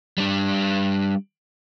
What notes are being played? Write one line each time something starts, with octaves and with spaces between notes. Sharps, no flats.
G3 D4